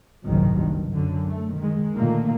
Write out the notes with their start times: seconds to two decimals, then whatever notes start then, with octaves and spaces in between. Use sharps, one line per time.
0.24 F#1 C2 G#2 C3 D#3 F#3
0.60 G2
0.94 F#2 D3
1.27 A3
1.57 D#3 G#3
1.94 A#2 D3 D#3 A3 A#3